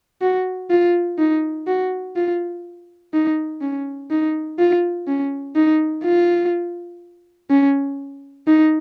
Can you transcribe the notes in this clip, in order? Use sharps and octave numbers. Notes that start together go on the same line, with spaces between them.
F#4
F4
D#4
F#4
F4
D#4
C#4
D#4
F4
C#4
D#4
F4
C#4
D#4